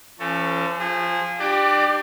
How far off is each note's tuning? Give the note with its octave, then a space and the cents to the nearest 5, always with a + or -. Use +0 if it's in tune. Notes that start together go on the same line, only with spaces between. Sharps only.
F3 -40 C#4 +0 A4 +20
F3 +0 G#4 -25
D4 +35 G4 +0 D5 +25